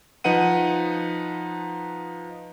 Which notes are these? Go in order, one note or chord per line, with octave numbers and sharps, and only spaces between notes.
F3 D#4 B4 F#5 D#7